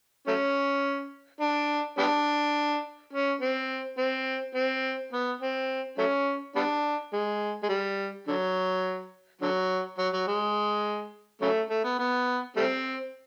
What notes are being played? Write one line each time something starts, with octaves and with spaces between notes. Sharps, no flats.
F#3 A3 C#4
D4
G3 B3 D4
C#4
C4
C4
C4
B3
C4
F#3 A3 C#4
G3 B3 D4
G#3
G#3
G3
D3 F#3
D3 F#3
F#3
F#3
G#3
C#3 F#3 A3
A3
B3
B3
G3 A3 C4